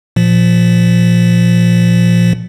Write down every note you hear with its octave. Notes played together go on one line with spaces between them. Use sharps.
A#2 F3